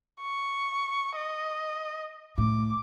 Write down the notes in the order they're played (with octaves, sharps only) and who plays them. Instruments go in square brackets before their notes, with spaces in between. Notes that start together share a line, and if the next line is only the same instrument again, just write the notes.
[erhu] C#6
D#5
[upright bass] A2 [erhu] D6